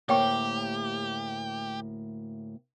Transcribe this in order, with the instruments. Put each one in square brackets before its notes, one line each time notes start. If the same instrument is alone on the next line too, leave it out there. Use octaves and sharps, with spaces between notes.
[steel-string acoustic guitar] D2 A2 A#3 [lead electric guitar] G4 [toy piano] C#5 G5 C#6